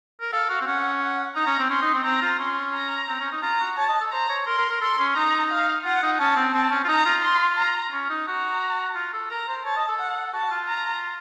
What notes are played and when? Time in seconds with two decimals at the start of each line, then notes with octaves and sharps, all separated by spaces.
0.21 A#4
0.32 A4 F5
0.49 F#4
0.61 C4
0.66 C#4 F#5
1.01 F#5
1.36 D#4 A#5
1.46 C#4
1.59 C4
1.70 C#4 C6
1.82 D#4
1.94 C4
2.04 C4 A#5
2.21 F4
2.39 C#4 C6
2.73 A#5
3.08 C4
3.20 C#4
3.32 D#4
3.42 F4 A#5
3.60 F#4
3.77 C#5 A5
3.88 D#5
4.00 A4
4.12 C5 A#5
4.29 C#5
4.46 A#4 C6
4.58 A#4
4.69 A#4
4.81 A4 C6
4.98 C#4
5.15 D#4 A#5
5.50 F5
5.84 F4 F#5
6.02 D#4
6.19 C#4 A5
6.36 C4
6.54 C4 A5
6.71 C#4
6.84 F4
6.88 D#4 A#5
7.05 F4
7.23 C6
7.57 A#5
7.92 C#4
8.10 D#4
8.26 F#4 A#5
8.95 F4
9.13 A4
9.30 A#4 A#5
9.48 C5
9.65 C#5 A5
9.76 D#5
9.88 A4
9.99 F#5
10.33 F#4 A5
10.51 F4
10.68 A#5